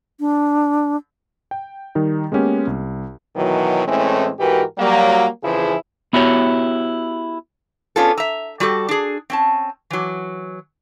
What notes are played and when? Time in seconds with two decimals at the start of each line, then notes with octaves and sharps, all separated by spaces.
0.20 D4
1.51 G5
1.95 D#3 G3 D#4
2.32 G#3 A#3 B3 C#4 G4
2.67 C2
3.36 B2 D#3 E3 F#3
3.87 A2 E3 G#3 A3 C4 C#4
4.39 G#2 E3 F#4 G4 A#4 B4
4.78 F#3 G3 A#3
5.43 F2 C#3 E3 F3 E4 G#4
6.13 B3 E4 F#4 G4 C#5
7.96 B3 C#4 D4 F4 G#4 A4
8.18 E5 A#5
8.60 G3 F#4 G4 A4
8.89 D4 G#4
9.30 C4 C#4 A5
9.90 E3 F#3